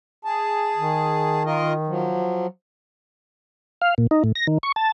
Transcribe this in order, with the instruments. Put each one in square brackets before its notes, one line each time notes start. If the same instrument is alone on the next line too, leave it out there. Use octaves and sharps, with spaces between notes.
[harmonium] G#4 A5
[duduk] D#3
[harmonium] F4 A#4 D#5
F3 F#3
[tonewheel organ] F5
A#2
D#4
A2
A#6
D#3
C#6
A5